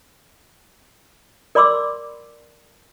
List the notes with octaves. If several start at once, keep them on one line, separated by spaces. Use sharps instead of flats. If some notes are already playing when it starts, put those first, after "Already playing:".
A#4 D5 B5 C6 D6 E6